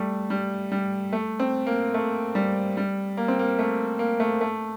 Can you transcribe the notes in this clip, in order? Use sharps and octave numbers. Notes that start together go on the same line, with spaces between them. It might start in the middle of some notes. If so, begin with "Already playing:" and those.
Already playing: G3 A3
G3
G3
A3
C4
A#3
A3
G3
G3
A#3
C4
A#3
A3
A#3
A3
A3